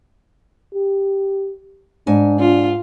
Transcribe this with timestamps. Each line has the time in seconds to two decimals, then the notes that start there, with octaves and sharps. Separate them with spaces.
0.74 G4
2.07 G#2 D4 G#5
2.40 D4 F4